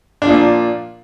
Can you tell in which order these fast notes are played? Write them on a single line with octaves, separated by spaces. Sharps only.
D4 F3 A#2